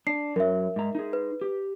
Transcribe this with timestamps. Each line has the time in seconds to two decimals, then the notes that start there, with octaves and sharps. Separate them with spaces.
0.07 D4 C7
0.36 F#2 F#3 A#4 E5
0.76 G#2 A#5
0.95 D#4 G#4
1.13 B4
1.41 G4